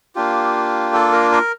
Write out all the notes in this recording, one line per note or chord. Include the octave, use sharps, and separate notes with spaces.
A#3 D4 F4 G4
A4
A#4
A#4